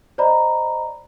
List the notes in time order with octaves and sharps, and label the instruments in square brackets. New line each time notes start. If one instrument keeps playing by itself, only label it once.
[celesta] C5 D5 D#5 A#5 B5